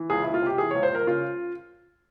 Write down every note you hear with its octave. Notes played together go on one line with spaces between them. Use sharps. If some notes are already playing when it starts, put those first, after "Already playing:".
Already playing: E3
C#2 G#4
C#2 E4
F4
C3 G4
E3 G#4
C#2 C#5
C5
C#2 A#4
C#3 F4